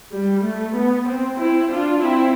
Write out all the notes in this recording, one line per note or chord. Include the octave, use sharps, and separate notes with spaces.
G3
A3
B3
C4
C4 E4
D4 F4
C4 E4